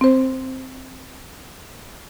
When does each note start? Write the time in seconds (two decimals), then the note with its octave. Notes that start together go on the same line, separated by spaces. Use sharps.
0.01 C4 C5